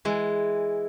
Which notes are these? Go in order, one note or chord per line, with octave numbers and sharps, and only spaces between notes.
E3 G#3